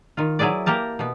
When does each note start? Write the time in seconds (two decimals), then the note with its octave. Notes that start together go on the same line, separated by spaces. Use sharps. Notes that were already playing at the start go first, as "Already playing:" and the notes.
0.17 D#3 F4
0.39 F#3 E4 G#4 B4 D5
0.66 A#3 G4 A#4 A5
0.99 B2 B3